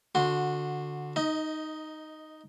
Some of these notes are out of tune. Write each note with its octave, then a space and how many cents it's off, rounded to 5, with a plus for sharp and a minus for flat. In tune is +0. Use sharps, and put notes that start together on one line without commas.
D3 +0 F#4 -20 C6 +0
D#4 +0 D#5 +25